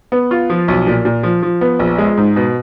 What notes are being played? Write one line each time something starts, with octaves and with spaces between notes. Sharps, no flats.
B3
F4
F3
B1
A#2
A#2
F3
F3
B3
A#1
G#3
G#2
B2